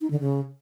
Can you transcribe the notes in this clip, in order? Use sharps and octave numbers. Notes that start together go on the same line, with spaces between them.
D#4
D3
C#3